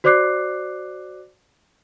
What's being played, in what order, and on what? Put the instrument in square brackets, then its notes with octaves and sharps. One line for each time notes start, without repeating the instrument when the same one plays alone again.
[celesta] F#4 C5 D5 D6 F#6 C7